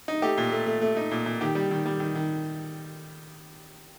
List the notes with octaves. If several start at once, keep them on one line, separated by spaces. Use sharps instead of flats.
D#4
A3 G4
A#2
A3
A3
A3
D#4
A#2
A#2
D#3 G4
G3
D#3
G3
D#3
D#3